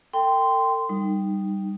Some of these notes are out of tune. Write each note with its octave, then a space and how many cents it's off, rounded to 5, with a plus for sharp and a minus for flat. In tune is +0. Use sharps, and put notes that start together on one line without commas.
A4 +45 G5 +0 C6 -15
G3 +0 D#4 -15